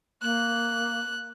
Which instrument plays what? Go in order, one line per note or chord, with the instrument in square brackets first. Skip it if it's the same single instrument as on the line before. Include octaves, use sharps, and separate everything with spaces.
[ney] A#3 [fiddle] F#6